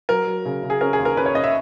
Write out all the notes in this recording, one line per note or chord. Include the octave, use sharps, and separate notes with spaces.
F#3 A#4
F#3
C#3
C#3
G#4
C#4 A#4
G#4
D#2
A#4
C#4 B4
C#5
C#4 D#5
E5